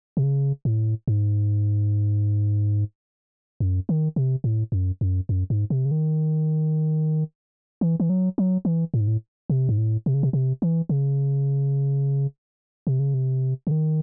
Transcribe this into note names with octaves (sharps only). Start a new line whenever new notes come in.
C3
C#3
A2
G#2
F#2
D#3
C3
A2
F#2
F#2
F#2
G#2
C3
C#3
D#3
E3
E3
F#3
F#3
E3
A2
G#2
A2
C3
G#2
A2
C3
C#3
C3
C3
E3
C#3
C3
C#3
C3
C#3
D#3